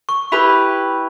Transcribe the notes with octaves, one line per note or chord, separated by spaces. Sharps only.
C#6
E4 G4 B4 B5